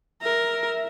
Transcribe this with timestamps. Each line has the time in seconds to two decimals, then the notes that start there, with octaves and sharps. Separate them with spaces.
0.22 A#4 E5